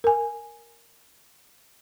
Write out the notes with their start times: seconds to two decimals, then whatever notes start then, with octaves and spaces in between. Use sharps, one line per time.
0.04 A#4 G#5